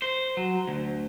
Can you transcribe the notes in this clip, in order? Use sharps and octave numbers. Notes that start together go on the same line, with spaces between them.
C5
F#3
D2